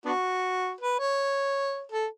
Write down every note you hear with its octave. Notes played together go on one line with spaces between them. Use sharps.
B3 D4 F#4
B4
C#5
A4